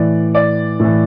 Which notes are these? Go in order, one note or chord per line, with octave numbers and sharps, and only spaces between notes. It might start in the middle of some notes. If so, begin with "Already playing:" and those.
Already playing: A2 E3 D5
D5
A2 E3